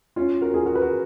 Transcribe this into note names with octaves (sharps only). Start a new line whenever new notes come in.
C#4 F4
F#4 A#4
F4 G#4
F#4 A#4
B4
F#4 A#4